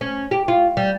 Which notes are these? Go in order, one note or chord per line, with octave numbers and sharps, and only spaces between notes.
C#4
G4
F4
G3